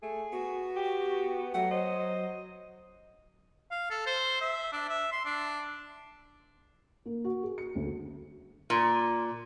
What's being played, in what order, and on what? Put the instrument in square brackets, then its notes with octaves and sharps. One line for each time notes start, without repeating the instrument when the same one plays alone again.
[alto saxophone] A3 [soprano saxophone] G#4
[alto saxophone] B3 [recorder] F#4
[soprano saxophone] G4
[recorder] F#3 [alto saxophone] A3 [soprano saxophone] F#5
[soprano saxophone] C5 [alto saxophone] D#5
[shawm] F5
A4
C5
E5
D4
E5
C6
D4
[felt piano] A#3
F#4
G#4
C#7
D2
[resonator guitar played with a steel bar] A#2